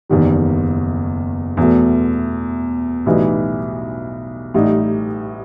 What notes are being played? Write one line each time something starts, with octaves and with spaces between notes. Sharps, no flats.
F#1 E2 D#3 G3
E2 B2 A3
B1 A2 E3 G3 D#4
A1 A2 G3 D#4